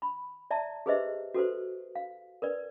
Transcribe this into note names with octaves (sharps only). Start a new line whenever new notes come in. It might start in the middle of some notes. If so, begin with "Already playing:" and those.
B5
D5 E5 A5 A#5
G4 G#4 B4 C5 D#5 E5
F#4 A4 B4 C5
F5
A#4 B4 D5